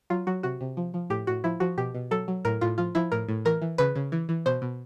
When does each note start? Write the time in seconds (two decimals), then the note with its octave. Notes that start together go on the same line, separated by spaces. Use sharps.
0.10 F#3 F4
0.27 F#3 F#4
0.43 C3 F#4
0.61 C3
0.77 F3
0.94 F3
1.10 A2 G4
1.27 A2 F#4
1.44 F3 E4
1.60 F3 F#4
1.78 B2 G4
1.95 B2
2.11 F#3 A4
2.28 F#3
2.45 A2 A#4
2.61 A2 F4
2.78 F3 F4
2.95 F3 E4
3.12 A2 A#4
3.29 A2
3.45 E3 A#4
3.62 E3
3.78 C#3 B4
3.95 C#3
4.12 E3
4.29 E3
4.46 B2 C5
4.62 B2